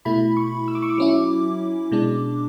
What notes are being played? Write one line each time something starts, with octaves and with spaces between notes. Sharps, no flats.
B2 A3 E4 B5
C#6
E6
D6
C#6
D6
F#3 C#4 E4
B2 G#3 D4